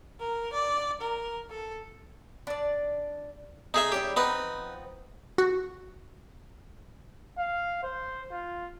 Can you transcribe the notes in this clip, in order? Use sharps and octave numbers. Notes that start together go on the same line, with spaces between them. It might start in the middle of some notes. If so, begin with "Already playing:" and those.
A#4
D5
A#4
A4
D4 D5
A3 D#4 G#4 E5
G3 C#4 E4 G4
F3 B3 C4 D#4 B4
F#4
F5
C5
F4